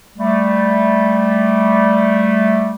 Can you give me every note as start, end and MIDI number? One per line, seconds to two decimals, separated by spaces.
0.17 2.75 55
0.17 2.75 57